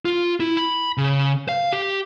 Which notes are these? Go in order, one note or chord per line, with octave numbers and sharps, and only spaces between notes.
F4
E4
B5
C#3
F5
G4